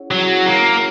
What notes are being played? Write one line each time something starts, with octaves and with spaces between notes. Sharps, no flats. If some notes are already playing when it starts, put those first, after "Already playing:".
Already playing: C#4 E4 G#4 C#5 F#5
F#3 C#4 E4 G#4 C#5 F#5
A#3